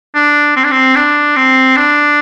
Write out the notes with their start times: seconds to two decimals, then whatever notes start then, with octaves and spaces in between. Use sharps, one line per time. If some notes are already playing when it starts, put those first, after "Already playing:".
0.15 D4
0.56 C4
0.64 D4
0.71 C4
0.96 D4
1.37 C4
1.76 D4